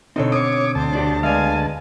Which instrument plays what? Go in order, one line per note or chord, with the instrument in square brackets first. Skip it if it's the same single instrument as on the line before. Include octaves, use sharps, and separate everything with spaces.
[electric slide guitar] B2 D3 C4 [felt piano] D#4 A4 C#5
[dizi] C#5 [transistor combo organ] D6 [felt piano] D#6
[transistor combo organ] D2 A5 [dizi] C5
[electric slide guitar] D4 F#4 G4
[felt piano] G#3 B3 D5 [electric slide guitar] F5 [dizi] G#5